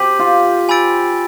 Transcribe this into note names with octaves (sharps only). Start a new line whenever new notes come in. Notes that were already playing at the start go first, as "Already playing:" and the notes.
Already playing: G4 C5 G6 B6 D#7 F#7
F4
G#5 B5 E6 A6 D7